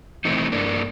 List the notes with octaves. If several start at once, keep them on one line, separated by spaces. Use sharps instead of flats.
E3 A3 C4 D#4
G2 A#3 D4